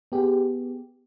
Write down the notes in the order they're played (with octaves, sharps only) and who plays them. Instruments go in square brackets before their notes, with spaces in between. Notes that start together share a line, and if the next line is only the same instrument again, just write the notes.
[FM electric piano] B3 G4 G#4